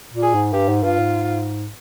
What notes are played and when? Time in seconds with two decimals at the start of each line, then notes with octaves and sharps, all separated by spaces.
0.13 A#2
0.23 G#4
0.34 G#2
0.53 G2 G4
0.68 G#2
0.83 G2 F4
0.99 G#2